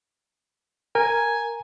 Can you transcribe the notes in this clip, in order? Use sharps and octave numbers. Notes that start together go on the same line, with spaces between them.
A#4 G#5